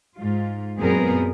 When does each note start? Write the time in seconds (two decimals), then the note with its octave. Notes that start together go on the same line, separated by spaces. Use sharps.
0.17 G#2 F4
0.78 F#2 A#2 B3 C4 G#4 A#4